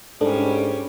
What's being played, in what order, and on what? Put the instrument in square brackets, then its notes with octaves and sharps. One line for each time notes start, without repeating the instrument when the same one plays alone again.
[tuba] G#2 [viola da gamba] G3 C#4 [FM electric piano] D4 [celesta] A4